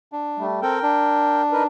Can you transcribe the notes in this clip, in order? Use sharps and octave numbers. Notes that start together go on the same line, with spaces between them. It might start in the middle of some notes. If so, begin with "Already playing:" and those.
D4
G3 A3
C4 A4 A#4 G5
D4
D#4 A#4 B4